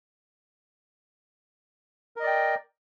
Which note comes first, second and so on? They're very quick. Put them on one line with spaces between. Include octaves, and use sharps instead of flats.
A#4 D#5 D5 G5